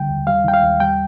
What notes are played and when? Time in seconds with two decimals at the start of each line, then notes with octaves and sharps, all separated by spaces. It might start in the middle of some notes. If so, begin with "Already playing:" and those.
Already playing: C2 D3 G3 G5
0.09 D#2
0.27 G3 F5
0.44 D#3 G5
0.54 F5
0.63 D#2
0.80 G3 G5